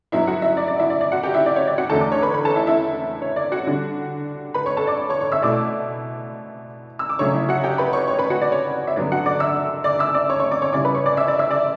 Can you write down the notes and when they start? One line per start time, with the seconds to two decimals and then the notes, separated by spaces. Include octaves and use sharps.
0.12 G2 F#3 B3 E4 E5
0.27 F#4 F#5
0.42 E4 E5
0.57 D5
0.68 D5
0.80 E4 E5
0.90 D5
1.01 D5
1.12 F#4 F#5
1.23 G4 G5
1.34 E4 E5
1.46 D5
1.56 C#5
1.67 D5
1.78 F#4 F#5
1.89 E2 D3 A3 A4 A5
2.01 D5 D6
2.12 C#5 C#6
2.23 B4 B5
2.33 B4 B5
2.45 A4 A5
2.56 E4 E5
2.67 E4 E5
3.22 C#5
3.36 D5
3.52 F#4 F#5
3.67 D3 G3 D4
4.54 B4 B5
4.66 C#5 C#6
4.77 A4 A5
4.87 D5 D6
5.10 C#5 C#6
5.20 C#5 C#6
5.32 E5 E6
5.42 B2 A3 E4 D5 D6
6.99 E6
7.09 D6
7.19 C#3 F#3 A3 D4 C#5 C#6
7.34 E4 E5
7.49 F#4 F#5
7.64 G4 G5
7.78 B4 B5
7.93 C#5 C#6
8.08 C#5 C#6
8.19 B4 B5
8.30 F#4 F#5
8.41 D5
8.52 C#5
8.87 E5
8.96 G2 D3 F#3 B3 D5
9.12 F#4 F#5
9.26 D5 D6
9.40 E5 E6
9.84 D5 D6
9.99 E5 E6
10.14 D5 D6
10.30 C#5 C#6
10.40 C#5 C#6
10.51 D5 D6
10.62 C#5 C#6
10.73 C#3 G3 C#4 E4 D5 D6
10.85 B4 B5
10.95 C#5 C#6
11.06 D5 D6
11.17 E5 E6
11.28 D5 D6
11.39 E5 E6
11.51 D5 D6